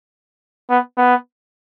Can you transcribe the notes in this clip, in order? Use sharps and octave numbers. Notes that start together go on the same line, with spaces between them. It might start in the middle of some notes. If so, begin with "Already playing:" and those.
B3
B3